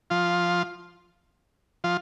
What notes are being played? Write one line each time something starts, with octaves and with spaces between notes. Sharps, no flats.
F3 F4
F3 F4